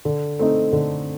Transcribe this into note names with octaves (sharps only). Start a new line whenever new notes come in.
D3
A3 C4 D#4
D3